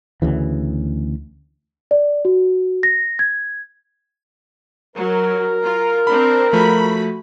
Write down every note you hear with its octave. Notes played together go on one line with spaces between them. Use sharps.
D2 C#3 E3
D5
F#4
A#6
G#6
F#3 A#4
F4
C4 D4 B5
F3 A3 F#4 B5